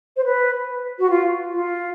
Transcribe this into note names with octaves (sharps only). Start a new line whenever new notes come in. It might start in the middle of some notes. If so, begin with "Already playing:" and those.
C5
B4
F#4
F4
F4